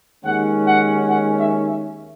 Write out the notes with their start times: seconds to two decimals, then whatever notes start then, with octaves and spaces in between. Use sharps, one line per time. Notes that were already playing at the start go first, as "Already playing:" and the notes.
0.23 D#2 D#3 G#3 C#4 F#5
0.66 F#5
1.09 F#5
1.38 E5
1.67 E5